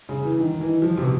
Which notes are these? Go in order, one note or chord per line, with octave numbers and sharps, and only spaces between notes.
C#3
E3
D#3
D#3
E3
F3
C3
B2